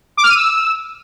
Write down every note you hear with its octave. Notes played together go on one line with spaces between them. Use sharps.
D6
F6
D#7
E6